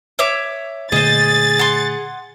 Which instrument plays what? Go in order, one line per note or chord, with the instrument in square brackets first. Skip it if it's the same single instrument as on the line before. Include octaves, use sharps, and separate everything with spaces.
[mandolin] C#5 E5 D6
[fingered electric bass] A#2 D3 A3 [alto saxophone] G#4 [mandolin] C5 D#5 [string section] A6
[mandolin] F#5 C6